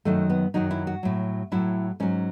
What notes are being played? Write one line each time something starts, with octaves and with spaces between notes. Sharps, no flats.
F#2 D#3 F#3 A3
B3
F#2 D#3 F#3 D#4
E4
F#4
A2 F#3
A2 F#3 E4
G#2 F#3 C#4